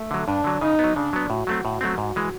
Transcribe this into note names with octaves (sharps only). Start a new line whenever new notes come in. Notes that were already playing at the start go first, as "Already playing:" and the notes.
Already playing: A3
D3 F#3
G2 D4
D3 F#3
C#3 D#4
F#3 B3
C#3 D4
F#3 B3
A2 F#4
F#3 A3 C4
A2
F#3 A3 C4
G#2
E3 G#3